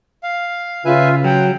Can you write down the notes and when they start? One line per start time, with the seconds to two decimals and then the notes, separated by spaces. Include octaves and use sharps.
0.23 F5
0.85 C#3 F4 B4 E5 G#5
1.24 F#3 F#5 G5